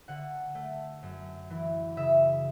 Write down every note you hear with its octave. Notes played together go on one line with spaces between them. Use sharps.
D3 F#5
A3
F#2
E3
C#3 E5